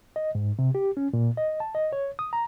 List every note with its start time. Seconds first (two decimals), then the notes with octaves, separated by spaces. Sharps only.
0.16 D#5
0.35 G#2
0.59 C3
0.75 G4
0.97 C#4
1.13 A#2
1.37 D#5
1.60 A5
1.75 D#5
1.93 C#5
2.19 D#6
2.33 A#5